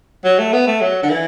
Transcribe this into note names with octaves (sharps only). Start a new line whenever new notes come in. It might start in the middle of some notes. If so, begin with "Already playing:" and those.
F#3
A3
B3
A3
F#3
D3
E3